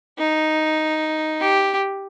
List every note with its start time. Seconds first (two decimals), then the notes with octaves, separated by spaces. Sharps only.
0.19 D#4
1.40 G4